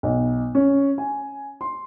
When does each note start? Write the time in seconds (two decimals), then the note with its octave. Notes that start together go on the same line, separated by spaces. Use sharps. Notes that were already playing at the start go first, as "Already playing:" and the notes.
0.03 B1
0.55 C#4
0.98 G#5
1.61 C6